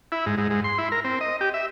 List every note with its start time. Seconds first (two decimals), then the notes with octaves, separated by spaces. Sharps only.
0.12 E4
0.26 G#2
0.38 G#2
0.50 G#2
0.64 C6
0.78 E4
0.92 A#4
1.04 C4
1.21 D#5
1.41 G4
1.54 E5